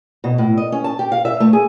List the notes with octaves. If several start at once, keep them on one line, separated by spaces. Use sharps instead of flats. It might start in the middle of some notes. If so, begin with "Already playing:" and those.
B2
A2
D#5
C#4
A5
G4
F5
E5
A3
G#4